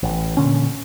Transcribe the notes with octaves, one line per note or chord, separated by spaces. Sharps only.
A1
A#2 D3 C#4